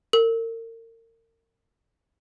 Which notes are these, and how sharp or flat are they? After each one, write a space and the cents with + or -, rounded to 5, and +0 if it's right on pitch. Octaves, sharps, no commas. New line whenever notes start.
A#4 -35